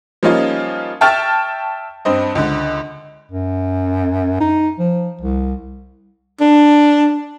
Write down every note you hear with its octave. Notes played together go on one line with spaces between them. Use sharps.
F3 G3 A#3 C#4 D#4 F4
E5 G5 A5 C#6 F6 A6
G2 C4 D#5
C#2 D3
F#2
D#4
F3
C2
D4